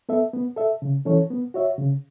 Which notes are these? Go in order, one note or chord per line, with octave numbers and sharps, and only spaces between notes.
B3 A4 E5
B3
A4 E5
C#3
E3 C#4 A4 C#5
B3
F#4 C#5 E5
C#3